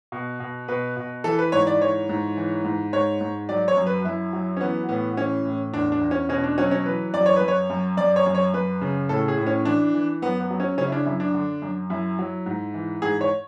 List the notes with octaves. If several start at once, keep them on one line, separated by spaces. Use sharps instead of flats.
B2
B2
B2 B4
B2
E3 A4
B4
G#2 C#5
D5
E3 C#5
G#2
E3
G#2
G#2 C#5
G#2
F#3 D5
C#5
F#2
B4
F#2 E4
F#3
C#4
E3 B3
A2 B3
E3 C#4
A2
E2 D4
D4
E2
C#4
B2 C#4
D4
F#3 C#4
C#4
E3 B4
F#2 D5
C#5
F#2 B4
C#5
F#2
F#2 D5
C#5
F#2
C#5
F#2 B4
C#3
A2 A4
G#4
A2
C#4
E3 D4
E3
F#2 B3
B3
F#3
C#4
C#3 C#4
E4
D4
F#2 E4
D4
D3
F#2
F#2 E4
F#3
G#2
E3
G#2 G#4
C#5